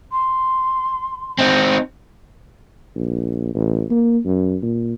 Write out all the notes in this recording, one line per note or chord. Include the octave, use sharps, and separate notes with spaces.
C6
C4 D#4
A#1
A1
A#3
F#2
A#2